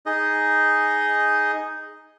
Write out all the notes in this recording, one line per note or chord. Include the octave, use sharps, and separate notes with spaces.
D#4 G#4 D#5